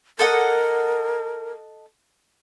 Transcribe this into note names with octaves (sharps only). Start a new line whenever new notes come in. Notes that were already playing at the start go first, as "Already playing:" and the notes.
A4 A#4 D#5 F#5